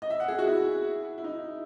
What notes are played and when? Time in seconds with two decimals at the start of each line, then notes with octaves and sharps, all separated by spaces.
0.02 D#5
0.10 E5
0.20 F#5
0.28 G#4
0.39 F#4
0.48 E4
1.18 E4
1.24 D#4